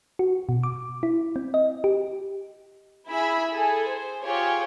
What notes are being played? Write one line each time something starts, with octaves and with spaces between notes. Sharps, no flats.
F#4
B2
D6
E4
C4
D#5
G4
E4 G#4 B5 E6
G#4 A4
C5
F4 G4 G#4 C#5